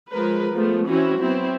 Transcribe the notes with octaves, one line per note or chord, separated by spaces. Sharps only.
F3 G#3 A#4 B4
F3 G#3 A3 B3
E3 C4 C#4 E4 F#4
F#3 B3 C4 E4